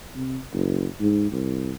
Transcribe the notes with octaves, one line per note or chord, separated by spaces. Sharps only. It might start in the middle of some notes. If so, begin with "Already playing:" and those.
C3
F#1
G#2
C2